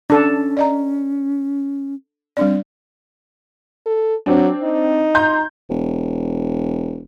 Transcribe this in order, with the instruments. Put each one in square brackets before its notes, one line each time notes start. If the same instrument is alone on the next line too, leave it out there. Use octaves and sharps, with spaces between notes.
[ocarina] C#4 [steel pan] D4 A4
[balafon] D5 D#5 A#5
[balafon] G3 D4 D5 [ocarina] C4
[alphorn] A4
[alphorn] F#3 [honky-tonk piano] C4 D4
[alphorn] D#4
[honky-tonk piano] A#5 C6 G6
[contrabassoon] E1